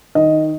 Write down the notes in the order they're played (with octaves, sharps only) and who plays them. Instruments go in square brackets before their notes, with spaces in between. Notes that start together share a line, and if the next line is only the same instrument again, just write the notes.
[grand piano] D#3 D#5